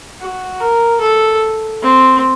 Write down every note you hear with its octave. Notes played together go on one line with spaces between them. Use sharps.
F#4
A#4
A4
C4